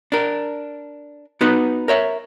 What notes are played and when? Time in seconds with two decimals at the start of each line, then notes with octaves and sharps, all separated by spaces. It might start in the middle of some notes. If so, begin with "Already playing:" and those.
0.12 D4 A#4
1.41 B3 D#4 F#4 B4
1.88 A#4 C#5 E5